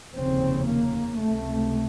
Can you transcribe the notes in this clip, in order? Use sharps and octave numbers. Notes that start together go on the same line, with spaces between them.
F1 D#2 C#3 C4
A#3
C#2 C3 A3